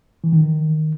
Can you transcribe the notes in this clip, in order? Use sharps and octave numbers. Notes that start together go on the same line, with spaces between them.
E3
D#3